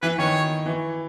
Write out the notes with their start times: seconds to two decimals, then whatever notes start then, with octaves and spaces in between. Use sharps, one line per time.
0.02 E3 B4
0.18 D#3 C#5
0.66 E3